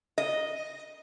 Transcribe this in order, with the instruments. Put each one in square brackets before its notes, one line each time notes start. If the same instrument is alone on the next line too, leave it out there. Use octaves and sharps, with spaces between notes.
[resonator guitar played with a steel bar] D#5